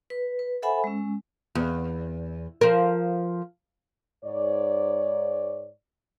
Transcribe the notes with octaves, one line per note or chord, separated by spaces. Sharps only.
B4
B4
A4 C5 E5 F#5 G#5 B5
G#3 C#4
E2
F3 A#4
G#2 C#5 D5